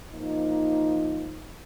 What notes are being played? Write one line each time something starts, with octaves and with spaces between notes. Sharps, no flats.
F3 A#3 D#4